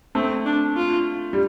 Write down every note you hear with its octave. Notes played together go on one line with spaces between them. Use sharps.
A3 C4
D4
F4
G3